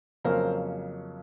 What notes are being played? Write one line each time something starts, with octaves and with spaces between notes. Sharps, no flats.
F2 C#3 F#3 A#3 C#4 A#4 C5